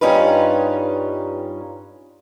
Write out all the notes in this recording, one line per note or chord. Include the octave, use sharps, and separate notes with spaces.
G2 G3 C#4 D#4 F4 B4